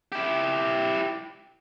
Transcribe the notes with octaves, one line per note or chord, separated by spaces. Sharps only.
E4 G4